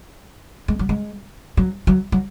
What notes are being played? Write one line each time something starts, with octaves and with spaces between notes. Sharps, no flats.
G#3
F#3
G#3
F#3
F#3
F#3